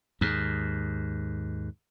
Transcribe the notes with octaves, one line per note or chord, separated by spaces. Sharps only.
D#2 G#2